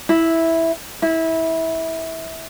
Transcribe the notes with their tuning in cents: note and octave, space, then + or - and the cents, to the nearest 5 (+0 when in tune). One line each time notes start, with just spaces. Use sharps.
E4 -5
E4 -20